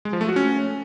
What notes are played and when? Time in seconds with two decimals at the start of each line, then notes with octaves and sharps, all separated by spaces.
0.05 G#3
0.13 F3
0.21 A3
0.28 F#4
0.36 C#4